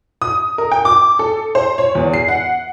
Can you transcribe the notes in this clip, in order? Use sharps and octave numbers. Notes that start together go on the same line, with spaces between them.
D#6
A#4
G5
D6
A4
C5
C#5
E2
C7
F#5